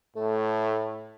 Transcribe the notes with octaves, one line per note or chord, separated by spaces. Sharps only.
A2 A3